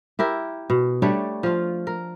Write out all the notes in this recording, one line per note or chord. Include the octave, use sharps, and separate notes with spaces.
E4 G4 A#4 E5
B2
G3 A3 D4 C#5
F3 F4
A#4